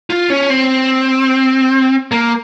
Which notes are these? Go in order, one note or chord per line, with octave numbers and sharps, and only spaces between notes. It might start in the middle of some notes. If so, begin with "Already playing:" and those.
F4
C#4
C4
A#3